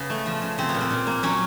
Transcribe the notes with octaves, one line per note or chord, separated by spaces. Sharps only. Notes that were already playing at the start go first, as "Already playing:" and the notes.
Already playing: C#3 B3
A3
F3
C#3
C#3 C4
B3
A#2
C4
A#2
A#3
F#3 C#4